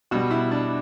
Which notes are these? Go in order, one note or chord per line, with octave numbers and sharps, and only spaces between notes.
B2 G3 F#4
E4
D4